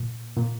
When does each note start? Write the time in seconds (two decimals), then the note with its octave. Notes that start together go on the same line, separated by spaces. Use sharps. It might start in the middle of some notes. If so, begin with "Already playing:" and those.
Already playing: A#2
0.37 A#2